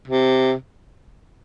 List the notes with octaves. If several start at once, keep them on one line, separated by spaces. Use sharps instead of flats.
C3